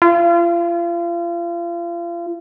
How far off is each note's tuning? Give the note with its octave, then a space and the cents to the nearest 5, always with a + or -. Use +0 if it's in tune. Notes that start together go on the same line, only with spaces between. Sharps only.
F4 -35